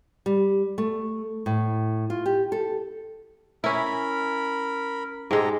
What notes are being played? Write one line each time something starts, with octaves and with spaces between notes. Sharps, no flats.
G3
A3
A2
F4
G4
A4
C#4 E4 A#4 B5
G#2 G#3 G4 A4 A#5